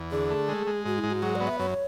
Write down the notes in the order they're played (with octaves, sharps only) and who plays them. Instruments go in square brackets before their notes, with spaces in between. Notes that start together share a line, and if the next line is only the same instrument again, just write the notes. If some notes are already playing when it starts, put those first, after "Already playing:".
Already playing: [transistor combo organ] E2
[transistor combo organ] D3 [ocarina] G#4
[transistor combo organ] A3
G#3
G#3
[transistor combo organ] G#2 [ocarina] F#4
[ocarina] E4
[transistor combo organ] G#2
[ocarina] F#4
[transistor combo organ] F#3 [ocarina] G#4
[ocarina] D5
[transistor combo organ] B3
[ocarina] E5
[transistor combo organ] F#2 [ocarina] C#5